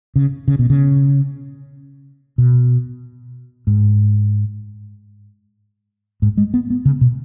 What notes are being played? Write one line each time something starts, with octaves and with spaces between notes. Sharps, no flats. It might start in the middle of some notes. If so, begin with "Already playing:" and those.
C#3
C#3
B2
C#3
B2
G#2
G#2
G#3
B3
B3
C#3
B2